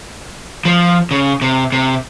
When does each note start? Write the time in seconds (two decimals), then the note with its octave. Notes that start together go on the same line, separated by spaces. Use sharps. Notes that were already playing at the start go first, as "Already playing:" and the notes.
0.65 F3
1.11 C#3
1.42 C3
1.72 C3